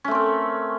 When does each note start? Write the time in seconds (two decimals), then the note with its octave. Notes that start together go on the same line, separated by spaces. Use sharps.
0.04 C#4
0.08 A3
0.11 C4
0.15 A#4